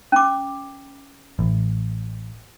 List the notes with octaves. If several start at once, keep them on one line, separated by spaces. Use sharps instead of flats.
C#4 D6
A1